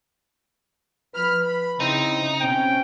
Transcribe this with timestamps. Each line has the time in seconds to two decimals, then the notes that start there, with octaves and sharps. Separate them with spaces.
1.14 F3 B4 B5 F6
1.44 B5
1.80 C#3 C4 D#4 E4
2.41 B2 C4 C#4 G5